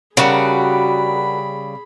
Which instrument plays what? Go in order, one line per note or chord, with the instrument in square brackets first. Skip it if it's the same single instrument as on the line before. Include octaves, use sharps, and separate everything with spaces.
[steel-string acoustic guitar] C#3 G3 [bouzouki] D4 F#4 A#4 [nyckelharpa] G#4 B5